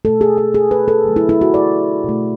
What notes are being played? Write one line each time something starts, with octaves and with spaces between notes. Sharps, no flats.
B2 A3 A4
G#4
G#4
G#4
B4
A4
D3 F#3 A3
E4
E4
F#4
D5
B2
A3